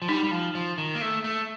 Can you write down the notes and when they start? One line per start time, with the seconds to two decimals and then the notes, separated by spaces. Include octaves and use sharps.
0.02 F3
0.08 G3 D#4
0.24 G3
0.31 F3
0.55 F3
0.78 D#3
0.95 A#3
1.01 A3
1.24 A3